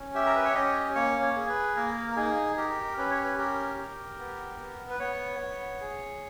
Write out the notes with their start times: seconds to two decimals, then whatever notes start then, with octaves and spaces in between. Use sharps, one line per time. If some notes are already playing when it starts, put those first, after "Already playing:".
Already playing: C#4
0.15 G4 E5
0.26 A#4
0.36 B4
0.45 C#5
0.55 C#4 D#5
0.95 A#3 C#5
1.22 C#5
1.36 G#4
1.49 B4
1.76 A#3 A#4
2.11 A#4
2.16 D#4 G#4
2.57 G4 A#4
2.97 C#4 B4
3.10 C#5
3.23 B4
3.38 G4 A#4
3.78 G4
4.19 B3
4.60 B3
4.90 B4
5.00 B3 C#5
5.39 B3
5.81 G#4